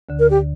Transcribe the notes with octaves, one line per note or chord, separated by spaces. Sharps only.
D2 D3
A#4
G4